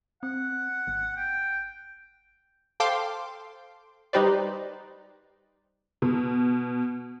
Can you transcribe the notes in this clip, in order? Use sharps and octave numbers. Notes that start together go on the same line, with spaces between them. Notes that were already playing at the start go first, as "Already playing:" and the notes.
C4 F#5
G#1
G5
A4 C5 F5 G5 C6 D6
G3 D#4 G4 B4 C5 D5
B2